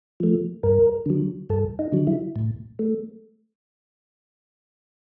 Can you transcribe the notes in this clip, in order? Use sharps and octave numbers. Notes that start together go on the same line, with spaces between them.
F3 A3
G2 A#4
D3 F#3
G2 A4
D#4
D3 F#3
E4
A2
A3